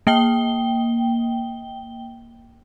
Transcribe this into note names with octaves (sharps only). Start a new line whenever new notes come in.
A#3 G5 G7